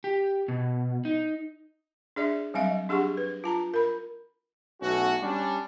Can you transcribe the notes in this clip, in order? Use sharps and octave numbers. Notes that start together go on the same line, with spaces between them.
G4
B2
D#4
D4 G#4 D5 E5
F#3 G3 C4 E5 F5
D4 G4 G#4 F#5 C#6
B4
F4 A5 A#5
A#4 B5
B1 A3 B3 C#4 F#4
G3 C#4 D4